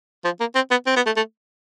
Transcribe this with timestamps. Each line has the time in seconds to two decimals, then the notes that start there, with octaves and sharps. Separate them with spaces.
0.25 F3
0.40 A#3
0.55 C4
0.71 B3
0.86 C4
0.96 B3
1.06 A3
1.16 A3